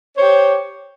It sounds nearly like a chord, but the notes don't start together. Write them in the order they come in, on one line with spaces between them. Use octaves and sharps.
C5 C#5 G4